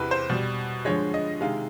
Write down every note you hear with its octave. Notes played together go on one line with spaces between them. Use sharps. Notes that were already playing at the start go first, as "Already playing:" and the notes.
Already playing: E2 C3 E3 B4
C5
B2 G3
G2 D3 F3 G#3 C#5
D#5
C3 D#3 G#3 F5